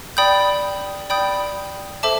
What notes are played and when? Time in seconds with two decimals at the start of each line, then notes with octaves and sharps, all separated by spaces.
0.17 D5 G5 B5 D#6 G6
1.10 D5 G5 B5 D#6 G6
2.03 A4 C5 E5 A5 D6